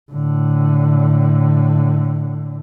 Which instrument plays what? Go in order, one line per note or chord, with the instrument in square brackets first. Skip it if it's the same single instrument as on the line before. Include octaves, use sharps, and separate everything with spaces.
[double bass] A2 D3